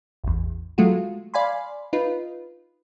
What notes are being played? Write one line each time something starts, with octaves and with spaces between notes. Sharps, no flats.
A1 E2
F#3 G#3 A3 F4 F#4
D5 F5 G#5 B5 C6
D#4 F4 B4